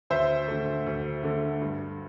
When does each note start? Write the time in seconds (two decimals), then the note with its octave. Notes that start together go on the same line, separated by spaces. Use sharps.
0.10 D2 C5 E5
0.48 D3 A3
0.86 D2
1.23 D3 A3
1.61 G2